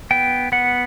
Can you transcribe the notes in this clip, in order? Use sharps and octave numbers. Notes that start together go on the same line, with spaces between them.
B3 G5
B3 F#5